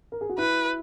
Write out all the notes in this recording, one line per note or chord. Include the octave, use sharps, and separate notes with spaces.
A#4
G#4
F#4
E4 B4